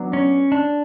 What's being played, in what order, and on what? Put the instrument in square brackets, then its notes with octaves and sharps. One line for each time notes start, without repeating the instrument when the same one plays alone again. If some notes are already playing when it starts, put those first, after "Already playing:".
Already playing: [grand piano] F#3 B3 D4
[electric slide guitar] C#4
D4